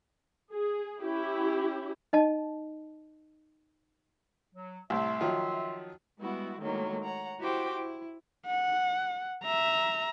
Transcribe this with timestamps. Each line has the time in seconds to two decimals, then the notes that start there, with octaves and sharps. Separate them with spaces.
0.52 G#4
1.02 C#4 E4 G4
2.13 D#4 D#5 A5
4.55 F#3
4.90 C2 A2 E5 C6
5.21 D#3 F3 F#3
6.18 G3 G#3 B3 E4 F#4
6.60 A2 D#3 F#3 G#3 A#3
7.03 C#5 F#5 A#5
7.39 E4 F#4 G4 C5 G5 D6
7.74 E4
8.46 F#5
9.43 E5 A#5